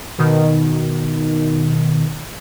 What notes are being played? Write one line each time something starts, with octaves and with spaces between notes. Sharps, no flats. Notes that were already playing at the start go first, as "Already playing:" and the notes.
B2 D#3